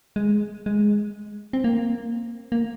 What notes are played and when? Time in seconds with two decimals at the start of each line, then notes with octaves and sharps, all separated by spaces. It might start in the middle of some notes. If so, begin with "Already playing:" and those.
0.16 G#3
0.66 G#3
1.53 C4
1.64 A#3
2.52 A#3